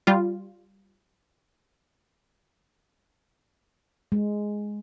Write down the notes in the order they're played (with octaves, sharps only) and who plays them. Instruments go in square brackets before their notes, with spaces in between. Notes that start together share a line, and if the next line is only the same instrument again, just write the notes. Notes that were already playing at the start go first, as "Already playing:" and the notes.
[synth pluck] G3 F4
[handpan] G#3